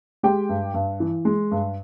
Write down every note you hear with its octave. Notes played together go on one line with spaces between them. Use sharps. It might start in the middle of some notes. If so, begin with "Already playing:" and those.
G#3 G4 G5
G2
G2
E3
G#3
G2